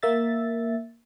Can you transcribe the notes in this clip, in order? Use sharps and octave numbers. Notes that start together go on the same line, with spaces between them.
A#3 E5 A6